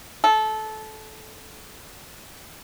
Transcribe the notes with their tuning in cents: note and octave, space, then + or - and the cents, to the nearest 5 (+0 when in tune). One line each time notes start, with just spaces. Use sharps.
A4 -20